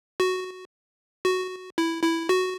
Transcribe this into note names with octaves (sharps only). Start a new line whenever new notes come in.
F#4
F#4
E4
E4
F#4